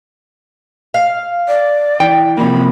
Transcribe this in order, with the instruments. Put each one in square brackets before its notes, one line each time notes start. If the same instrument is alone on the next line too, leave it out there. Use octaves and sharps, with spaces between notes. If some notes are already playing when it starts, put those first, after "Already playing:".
[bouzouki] F5
[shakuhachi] D5
[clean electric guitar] E3 [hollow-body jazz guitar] G5
[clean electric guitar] C3 F3 A#3 [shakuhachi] B5